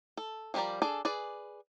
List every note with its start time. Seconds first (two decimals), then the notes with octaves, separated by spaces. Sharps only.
0.17 A4
0.54 F3 G3 G4 A#4 D5
0.82 D4 G#4 A4 D5
1.05 G#4 B4 D5